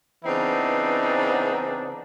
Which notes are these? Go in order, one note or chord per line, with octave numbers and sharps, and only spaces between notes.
C#3 E3 B3 C4 D4 D#4